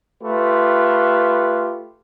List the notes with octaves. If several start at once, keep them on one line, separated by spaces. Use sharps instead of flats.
A3 F4 G4 B4